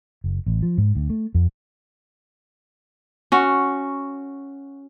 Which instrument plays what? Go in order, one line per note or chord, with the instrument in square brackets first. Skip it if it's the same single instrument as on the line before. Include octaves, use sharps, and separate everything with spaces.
[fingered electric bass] F#1
A1
F3
G#2
D2
A3
F2
[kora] C#4 F#4